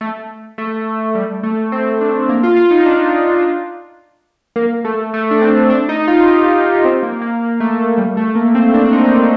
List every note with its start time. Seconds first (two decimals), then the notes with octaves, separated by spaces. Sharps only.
0.01 A3
0.58 A3
1.15 G3
1.43 A3
1.72 C4
2.01 D4
2.29 A#3
2.43 F4
2.56 F4
2.71 D#4
2.86 D4
4.56 A#3
4.84 A3
5.14 A3
5.31 D4
5.41 C4
5.70 D4
5.89 D#4
6.07 F4
6.26 G4
6.85 C4
7.03 A#3
7.22 A#3
7.41 A#3
7.60 A3
7.79 A3
7.98 G3
8.17 A3
8.35 A#3
8.55 C4
8.74 D4
8.85 D4
8.92 D#4